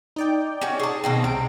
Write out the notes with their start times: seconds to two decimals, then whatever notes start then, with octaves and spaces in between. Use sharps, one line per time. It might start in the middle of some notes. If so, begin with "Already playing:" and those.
0.16 D#4 D5 G5
0.61 C#4 F#4
0.80 G#4 A5
1.04 B2 D#3 C4
1.24 C2 C3 D7